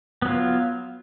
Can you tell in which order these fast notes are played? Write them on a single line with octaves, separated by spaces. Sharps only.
B3 F#3 F4